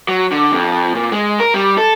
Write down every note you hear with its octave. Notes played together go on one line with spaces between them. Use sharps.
F#3
D3
F2
A#2
G#3
A#4
G3
A4